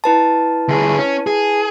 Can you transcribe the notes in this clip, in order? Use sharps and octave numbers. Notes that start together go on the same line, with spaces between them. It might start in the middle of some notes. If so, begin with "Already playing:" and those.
E4 B4 A5
D2 G#4
C#4
G#4